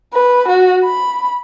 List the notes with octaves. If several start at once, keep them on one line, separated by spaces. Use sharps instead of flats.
B4
F#4
B5